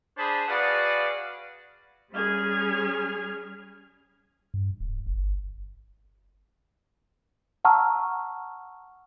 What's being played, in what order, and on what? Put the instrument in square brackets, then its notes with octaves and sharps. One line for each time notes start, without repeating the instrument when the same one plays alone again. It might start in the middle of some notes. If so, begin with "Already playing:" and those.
[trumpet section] D4 G#4 C5 A5 B5
F#4 G#4 B4 D5 F5 F#5
[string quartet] G3 C#4 G#4 F6 G#6
[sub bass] G2
D1
G1
[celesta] F#5 A5 A#5 C#6 E6 F6